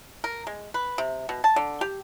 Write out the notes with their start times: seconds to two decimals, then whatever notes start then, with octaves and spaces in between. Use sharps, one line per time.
0.24 A#4
0.47 G#3
0.74 B4
0.98 C3
1.29 B2
1.44 A5
1.56 D3
1.81 G4